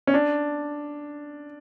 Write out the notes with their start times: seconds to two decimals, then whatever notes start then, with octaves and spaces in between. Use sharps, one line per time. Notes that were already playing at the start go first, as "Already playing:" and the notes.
0.07 C#4
0.14 D4